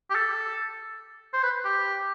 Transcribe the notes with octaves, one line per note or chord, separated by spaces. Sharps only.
G4
A4
C5
B4
G4